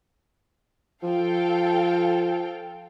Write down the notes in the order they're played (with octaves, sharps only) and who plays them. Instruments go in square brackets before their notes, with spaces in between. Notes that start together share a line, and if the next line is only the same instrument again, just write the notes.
[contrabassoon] F3 [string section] A4 F5 G5